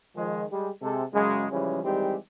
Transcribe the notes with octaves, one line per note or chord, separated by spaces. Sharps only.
D#3 F3 G#3
G3 G#3
C3 G#3 A4
F#2 C#3 F#3 G#3
C#3 E3 F3 G3 G#3 C#4
D#3 E3 G3 G#3 C4 G4